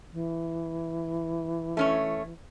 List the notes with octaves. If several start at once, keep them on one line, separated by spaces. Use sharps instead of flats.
E3
A3 C#4 C#5